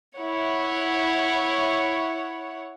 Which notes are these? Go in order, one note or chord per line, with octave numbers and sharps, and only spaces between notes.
E4 C#5 F#5